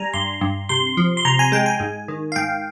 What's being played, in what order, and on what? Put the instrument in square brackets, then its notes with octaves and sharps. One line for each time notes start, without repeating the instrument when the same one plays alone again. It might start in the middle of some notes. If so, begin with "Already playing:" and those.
Already playing: [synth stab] G3 G#5 A#5
G2 C6
G2
C3 C6
F3
C6
C3 A#5
G#5
G#3 G5
G#5
G#2
D#3
F5
G#2 G5